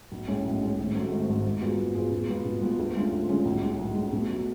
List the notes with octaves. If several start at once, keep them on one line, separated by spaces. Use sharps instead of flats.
B1
A2 G#3 C#4
B1
A2 G#3 C#4
G#1
G#2 F#3 A3
G#1
G#2 F#3 A3
G#2
F#3 B3 F4 G#4
G#2
F#3 B3 F4 G#4
B2
G#3 B3 F4
B2
G#3 B3 F4
D2
D3 G#3 C#4 F4
D2
D3 G#3 C#4 F4
B1
A2 G#3
B1
A2 G#3
B2
F#3 A3